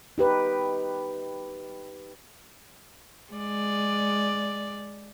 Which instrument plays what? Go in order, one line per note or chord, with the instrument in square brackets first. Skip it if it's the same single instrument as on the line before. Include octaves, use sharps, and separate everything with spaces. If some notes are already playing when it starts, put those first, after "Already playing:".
[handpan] D#4 G4 B4
[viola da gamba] G#3 D5